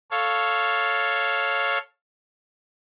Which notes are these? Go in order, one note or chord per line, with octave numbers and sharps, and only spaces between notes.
A4 C#5 F5